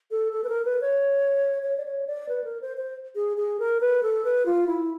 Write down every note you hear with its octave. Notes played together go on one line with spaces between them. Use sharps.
A4
A4
B4
A#4
B4
C#5
C#5
D5
C#5
D5
B4
A#4
C5
C5
G#4
G#4
A#4
B4
A4
B4
F4
E4